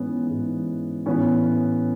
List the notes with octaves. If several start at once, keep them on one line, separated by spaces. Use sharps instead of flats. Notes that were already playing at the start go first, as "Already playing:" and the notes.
Already playing: G#2 E3 B3 C#4
G#2 E3
A2 E3 B3 C#4